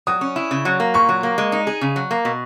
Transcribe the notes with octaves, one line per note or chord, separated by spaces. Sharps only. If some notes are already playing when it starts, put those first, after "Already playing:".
F#3 D#6
C#4
E4
C#3
F#3
A#3
A#2 C#6
F#3
A#3
G#3
D#4
G#4
C#3
F#3
A#3
B2